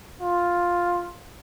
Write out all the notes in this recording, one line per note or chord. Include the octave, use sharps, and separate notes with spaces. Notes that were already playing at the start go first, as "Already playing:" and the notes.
F4